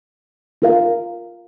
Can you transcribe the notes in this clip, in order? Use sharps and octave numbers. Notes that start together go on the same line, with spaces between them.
F4 A#4 F5